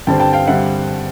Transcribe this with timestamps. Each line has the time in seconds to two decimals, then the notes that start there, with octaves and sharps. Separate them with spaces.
0.07 G2 D3 G3 C4 G5 A5
0.20 G5 A5
0.33 F5 G5
0.47 D3 G3 C4 E5 F#5